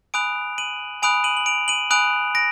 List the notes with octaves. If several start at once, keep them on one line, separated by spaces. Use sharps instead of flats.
G#5 B5 D#6 F#6 D7 F7
D#7 F#7
G#5 B5 D#6 F#6 D7 F7
D#7 F#7
F#7
D7 F7
D#7 F#7
G#5 B5 D#6 F#6 D7 F7
A#6 D7